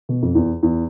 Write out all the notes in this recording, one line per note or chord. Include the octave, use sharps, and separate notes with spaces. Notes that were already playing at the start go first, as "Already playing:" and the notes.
B2
F2
E2
E2